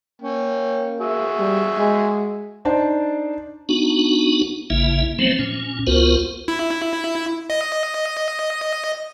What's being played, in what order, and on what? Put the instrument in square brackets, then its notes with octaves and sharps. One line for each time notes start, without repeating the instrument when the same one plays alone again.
[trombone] A#3 [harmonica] C#4 G5
[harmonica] F#4 G#4 E5
[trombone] G3
G#3
[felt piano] D4 D#4 C5 D5 A5
[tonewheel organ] B3 D4 D#4 F#4
A1 C#3 A#3 E4 E5
F3 F#3 A3 B3 C4 C5
A#2 C#4
C#2 B3 F4 F#4 A#4 C5
[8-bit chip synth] E4
D#5